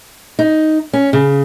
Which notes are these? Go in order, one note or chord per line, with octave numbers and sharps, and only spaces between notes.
D#4
C#4
C#3